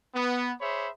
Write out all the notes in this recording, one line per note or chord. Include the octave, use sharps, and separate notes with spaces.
B3
G#4 C5 C#5 E5 B5